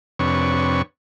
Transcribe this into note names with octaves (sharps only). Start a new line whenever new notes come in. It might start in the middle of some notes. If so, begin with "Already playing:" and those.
F2 C3 D4 B4 C#5 C#6